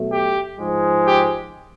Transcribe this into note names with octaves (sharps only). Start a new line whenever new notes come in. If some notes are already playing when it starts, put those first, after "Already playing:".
Already playing: B2 F#3 A3
G4
G#2 F3 G#3
G4